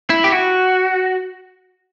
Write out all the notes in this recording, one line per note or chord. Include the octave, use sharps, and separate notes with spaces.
E4
G4
F#4